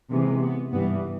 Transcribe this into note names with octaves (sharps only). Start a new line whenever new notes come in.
C3 E3 G#3
B3
G2 E3 G3 B3